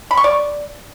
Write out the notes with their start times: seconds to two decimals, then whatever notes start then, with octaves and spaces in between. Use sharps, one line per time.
0.11 B5
0.17 C#6
0.24 D5